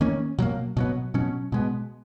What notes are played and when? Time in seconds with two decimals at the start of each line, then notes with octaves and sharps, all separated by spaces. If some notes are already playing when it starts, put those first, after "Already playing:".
0.01 D#3 A#3 C#4
0.38 B2 F#3 A#3
0.77 B2 F#3 B3
1.14 B2 F#3 C#4
1.52 B2 G#3 B3